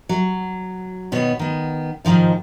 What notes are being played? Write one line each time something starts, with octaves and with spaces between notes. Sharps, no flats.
F#3
B2 D#3 B3 C#5
D#3 B3
G#2 D#3 F3 F4